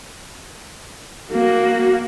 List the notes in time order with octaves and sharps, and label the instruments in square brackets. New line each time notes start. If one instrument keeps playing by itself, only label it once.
[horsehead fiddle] A#3 F#4